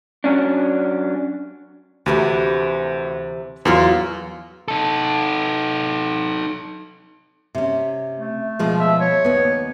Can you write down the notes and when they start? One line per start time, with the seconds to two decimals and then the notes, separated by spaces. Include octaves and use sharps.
0.24 F#3 C#4 D4
2.06 D2 C3 E3 B3
3.65 E2 F#3 A#3 F4
4.68 D#4 A4
7.55 C3 C#4
8.18 A3
8.59 B2 F3 G#3
8.80 E5
9.01 C#5
9.25 D#2 B3